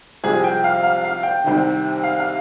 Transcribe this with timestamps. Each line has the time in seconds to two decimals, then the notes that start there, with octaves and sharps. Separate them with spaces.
0.24 C2 C3 F3 G#4
0.44 G5
0.64 F5
0.83 F5
1.04 F5
1.23 G5
1.44 C2 C3 D#3
2.03 F5
2.20 F5